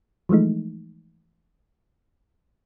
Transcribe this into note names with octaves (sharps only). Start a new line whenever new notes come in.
E3 F3 G#3 A3 D#4